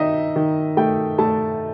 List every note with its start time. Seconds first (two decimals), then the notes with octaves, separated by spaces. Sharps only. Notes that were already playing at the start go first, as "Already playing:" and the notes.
Already playing: D#3 D#4 D#5 E5
0.36 D#3
0.77 A3 G5
1.18 A3 A5